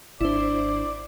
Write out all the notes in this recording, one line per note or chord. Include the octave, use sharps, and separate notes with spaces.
G#1 D4 E4 C5 D5